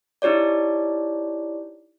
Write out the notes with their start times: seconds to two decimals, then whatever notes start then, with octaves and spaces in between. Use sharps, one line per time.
0.22 D#4 E4 G4 C#5 D5